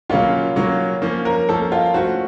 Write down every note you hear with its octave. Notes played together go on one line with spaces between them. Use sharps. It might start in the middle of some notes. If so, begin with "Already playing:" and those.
C#3 F#3 A#3 C#4 F4
C#3 F#3 A#3 C#4
F3 A#3 C#4
A#4
F3 A#3 C#4 A4
F4
A3 C#4 F#4 A4 C5